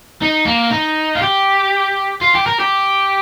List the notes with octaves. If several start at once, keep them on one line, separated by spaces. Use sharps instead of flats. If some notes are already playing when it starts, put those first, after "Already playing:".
D#4
A#3
D#4
F4
G4
F4
G4
A#4
G4